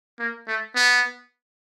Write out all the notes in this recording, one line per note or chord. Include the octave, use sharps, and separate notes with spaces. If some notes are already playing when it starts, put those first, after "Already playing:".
A#3
A3
B3